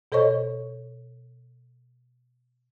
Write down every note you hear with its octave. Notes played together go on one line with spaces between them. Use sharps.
B2 A4 C5 C#5 D#5 C#6